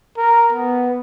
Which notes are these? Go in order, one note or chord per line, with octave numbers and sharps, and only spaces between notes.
A#4
B3